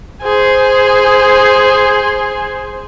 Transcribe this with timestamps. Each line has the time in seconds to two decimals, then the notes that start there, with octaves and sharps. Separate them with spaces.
0.22 G#4 C5